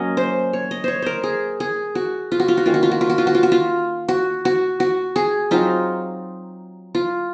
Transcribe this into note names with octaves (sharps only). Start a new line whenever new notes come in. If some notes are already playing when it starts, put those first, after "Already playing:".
Already playing: F#3 A#3 C#4 D#5
C5
C#5
D#5
C5 C#5
A#4 C5
G#4
G#4
F#4
F4
F#4
F4
F#4
D#3 A#3 C#4 F4
F#4
F4
F#4
F4
F#4
F4
F#4
F4
F#4
F4
F#4
F#4
F#4
G#4
F#3 C4 D#4 F4
F4